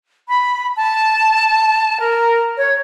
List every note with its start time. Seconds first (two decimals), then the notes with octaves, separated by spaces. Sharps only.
0.28 B5
0.76 A5
1.99 A#4
2.57 C#5